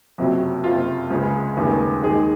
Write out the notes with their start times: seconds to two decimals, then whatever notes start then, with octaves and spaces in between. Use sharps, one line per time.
0.18 F#1 F2 C3 F#3
0.64 F#1 F2 C3 F4
1.11 C#2 C#3 G#3
1.57 F1 D#2 C#3 G#3
2.03 D#2 D#3 G#3 G#4